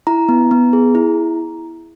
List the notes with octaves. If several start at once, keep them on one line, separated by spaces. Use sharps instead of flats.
E4 A#5
B3
B3
G#4
E4